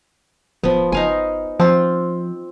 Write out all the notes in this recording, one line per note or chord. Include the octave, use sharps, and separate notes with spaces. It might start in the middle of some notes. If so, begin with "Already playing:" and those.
D1 F3 B3
F#1 D#4 F5 G#5
F3 C4 F4